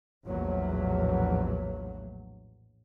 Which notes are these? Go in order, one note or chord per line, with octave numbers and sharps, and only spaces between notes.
A#1 E2 A2 F#3